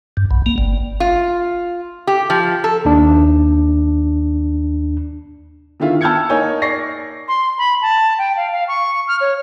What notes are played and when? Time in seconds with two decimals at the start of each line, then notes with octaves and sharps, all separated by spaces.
0.17 G2
0.31 B1
0.46 A#3
0.58 G1
1.00 F4
2.07 G4
2.30 F3
2.64 A4
2.85 D#2 D4
5.80 D3 D#3 E4 F4
6.01 A5 E6 F6 G6 G#6 C#7
6.29 A#3 D#4 A#4 C#5 G#5 G6
6.62 D5 C#6 A#6 C7
7.28 C6
7.58 B5
7.82 A5
8.19 G5
8.37 F5
8.52 F5
8.68 C#6
9.08 F6
9.21 C#5